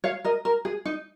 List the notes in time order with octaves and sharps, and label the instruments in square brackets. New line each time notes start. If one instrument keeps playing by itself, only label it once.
[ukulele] C#5 F5
A#4 D#5
A#4
G#4
D#4